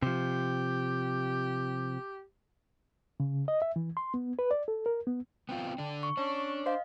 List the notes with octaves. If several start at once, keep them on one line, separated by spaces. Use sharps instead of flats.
C3 F3 G4
C#3
D#5
E5
E3
C6
B3
B4
D5
A4
A#4
B3
B3 C4 F4 G5
D3 D4
C#6
C#4 D4
C5 D#5 F5